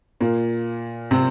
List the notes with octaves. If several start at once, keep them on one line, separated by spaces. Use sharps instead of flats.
A#2 A#3
C3 C4